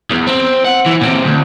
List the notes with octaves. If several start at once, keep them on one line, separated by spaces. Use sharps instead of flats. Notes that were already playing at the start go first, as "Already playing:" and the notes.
E2
C4
F#5
E3
A#2 C4
D2